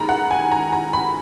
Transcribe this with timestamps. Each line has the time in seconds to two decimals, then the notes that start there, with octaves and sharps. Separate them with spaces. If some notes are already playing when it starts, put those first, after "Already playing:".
Already playing: D#2 D#3 G#3 A#5 B5
0.09 F#5
0.31 G#5
0.52 A#5
0.73 A#5
0.93 B5